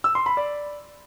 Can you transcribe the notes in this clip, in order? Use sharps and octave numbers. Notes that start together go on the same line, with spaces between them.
E6
C6
B5
D5